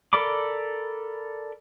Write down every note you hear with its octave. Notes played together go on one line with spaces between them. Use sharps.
A4 A#4 D5 B5 D6